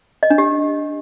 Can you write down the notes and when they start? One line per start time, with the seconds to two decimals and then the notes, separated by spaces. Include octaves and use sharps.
0.23 D#5
0.30 D4
0.38 G4